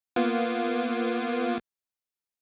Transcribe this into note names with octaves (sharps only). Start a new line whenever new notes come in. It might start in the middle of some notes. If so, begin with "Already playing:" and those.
A#3 B3 F4